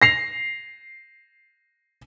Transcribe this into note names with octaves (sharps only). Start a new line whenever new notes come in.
A#6 C7 F7